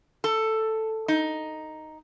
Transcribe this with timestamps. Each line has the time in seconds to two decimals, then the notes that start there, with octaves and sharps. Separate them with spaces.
0.24 A4
1.08 D#4